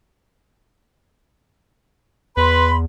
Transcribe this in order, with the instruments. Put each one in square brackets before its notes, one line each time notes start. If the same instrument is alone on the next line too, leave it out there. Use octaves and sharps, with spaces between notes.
[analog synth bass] E2 [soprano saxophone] B4 [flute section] B5 C6